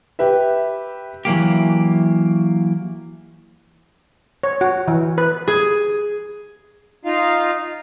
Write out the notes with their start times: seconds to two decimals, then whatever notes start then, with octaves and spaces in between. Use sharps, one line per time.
0.19 G4 B4 E5
1.25 E3 F#3 A#3 G4
4.43 C#5
4.61 F#4
4.88 E3
5.18 B4
5.47 G#4
7.05 D#4 F4 F5